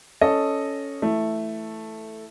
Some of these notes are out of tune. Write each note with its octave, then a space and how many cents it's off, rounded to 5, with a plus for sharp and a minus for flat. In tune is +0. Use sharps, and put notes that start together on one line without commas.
C#4 +5 A4 +0 D#5 -5
E3 +0 A3 +0 E4 +0